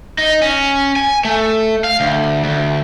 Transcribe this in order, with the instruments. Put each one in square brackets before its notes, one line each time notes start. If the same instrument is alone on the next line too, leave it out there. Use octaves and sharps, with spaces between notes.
[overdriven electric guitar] D#4
C#4
G#5
A3
F5
D2
D2